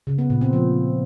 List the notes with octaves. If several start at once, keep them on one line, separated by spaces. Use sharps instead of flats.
C#3
B3
A#2
C4
F3